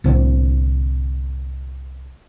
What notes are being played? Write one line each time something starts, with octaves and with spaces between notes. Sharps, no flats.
C2 A2 D3 C4